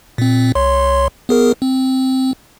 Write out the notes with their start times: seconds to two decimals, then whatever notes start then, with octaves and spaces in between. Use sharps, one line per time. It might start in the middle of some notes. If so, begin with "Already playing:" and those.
0.18 A#2 C4
0.55 C2 C#5 C6
1.29 B3 G#4 A#4
1.62 C4